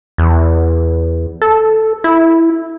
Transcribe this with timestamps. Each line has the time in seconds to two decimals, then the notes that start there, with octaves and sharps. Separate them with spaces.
0.18 E2
1.41 A4
2.04 E4